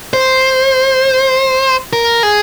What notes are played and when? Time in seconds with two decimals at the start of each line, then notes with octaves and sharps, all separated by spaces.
0.14 C5
1.93 A#4
2.23 G#4